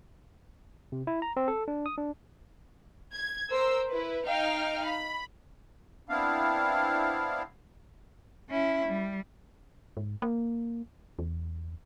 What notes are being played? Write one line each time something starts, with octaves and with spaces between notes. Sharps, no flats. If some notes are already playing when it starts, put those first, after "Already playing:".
C3
E4
A#5
C4
A4
D4
D#6
D4
G#6
A#4 C5 E6
E4 B4
D#4 F5 G5 F6
B5
B3 C4 D4 E4 F5
C#4 E4
G3
G#2
A#3
E2